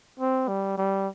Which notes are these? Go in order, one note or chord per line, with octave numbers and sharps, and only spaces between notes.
C4
G3
G3